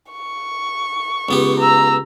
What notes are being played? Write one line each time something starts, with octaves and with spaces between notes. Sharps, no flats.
C#6
C#2 B3 G4
A#5 E6